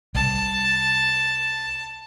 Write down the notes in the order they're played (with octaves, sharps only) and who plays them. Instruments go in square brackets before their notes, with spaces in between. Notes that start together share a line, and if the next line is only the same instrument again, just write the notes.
[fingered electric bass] C2 [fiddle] A5